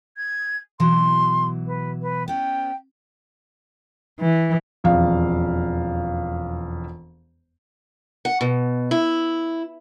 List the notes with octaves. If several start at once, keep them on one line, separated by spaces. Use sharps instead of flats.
G#6
B2 E3 F#3 C6
B4
B4
B3 C#4 G5
E3
E1 F2 F5
F#5
B2
E4